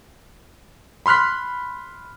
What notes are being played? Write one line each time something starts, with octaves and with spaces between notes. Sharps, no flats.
B5 C6 F6 F#6 B6